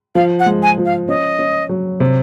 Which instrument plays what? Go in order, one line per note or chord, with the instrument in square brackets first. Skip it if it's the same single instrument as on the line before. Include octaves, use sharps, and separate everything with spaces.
[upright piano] F3 [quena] F5
[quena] F#5
[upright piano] G#3
[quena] G#5
[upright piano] F3
[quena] F5
[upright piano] C#4 [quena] D#5
[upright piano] C#4
F#3
C3